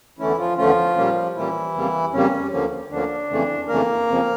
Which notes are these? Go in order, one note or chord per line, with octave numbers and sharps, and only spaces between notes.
E2 D3 E3 A3 C#4 E4
F3 F4
E2 D3 F3 A3 C#4 F4
A#2 G3 A#3 C#4
A#2 E3 G3 A#3 C#4 E4
F2 C#3 G3 A#3
F2 C#3 G3 A#3 C#4
D2 D3 F3 A#3 C#4
D2 D3 F3 A#3 C#4 D4
F2 C#3 E3 A3
F2 C#3 E3 A3 A#3 A#4
F2 C#3 F3